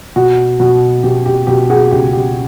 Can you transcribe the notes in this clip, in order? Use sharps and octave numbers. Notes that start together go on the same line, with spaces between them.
B2 F#4
B2 F#4
B2 G4
G4
B2 G4
F#4 G#4
C#2 G4
G4